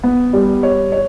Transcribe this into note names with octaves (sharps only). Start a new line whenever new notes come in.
B3
G3
C#5
C#5